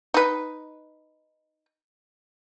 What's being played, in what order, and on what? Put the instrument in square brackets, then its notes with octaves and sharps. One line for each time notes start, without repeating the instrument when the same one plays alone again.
[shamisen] D#4 B4